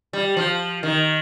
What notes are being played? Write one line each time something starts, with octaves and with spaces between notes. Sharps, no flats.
G3
F3
D#3